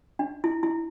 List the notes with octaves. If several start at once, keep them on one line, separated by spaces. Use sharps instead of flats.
D4
E4
E4